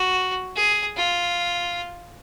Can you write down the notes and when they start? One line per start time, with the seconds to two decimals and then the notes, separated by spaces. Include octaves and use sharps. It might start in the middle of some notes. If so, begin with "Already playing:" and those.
Already playing: F#4
0.56 G#4
0.96 F4